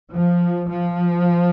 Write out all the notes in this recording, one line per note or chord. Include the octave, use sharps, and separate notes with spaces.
F3
F3